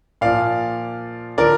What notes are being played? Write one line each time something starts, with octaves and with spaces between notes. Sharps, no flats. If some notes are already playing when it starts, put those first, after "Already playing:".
A#2 F3 D5 F5
D3 F3 A#4 D5